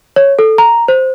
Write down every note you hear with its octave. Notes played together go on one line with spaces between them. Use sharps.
C#5
A4
A#5
C5